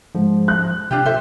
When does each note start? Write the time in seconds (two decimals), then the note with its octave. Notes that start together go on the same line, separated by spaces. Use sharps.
0.15 G#2 F3
0.48 F#6
0.91 C3 D4 F4 G4
1.05 C3 A4 C5 E5